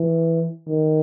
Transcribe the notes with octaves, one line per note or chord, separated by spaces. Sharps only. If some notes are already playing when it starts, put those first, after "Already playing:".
Already playing: E3
D#3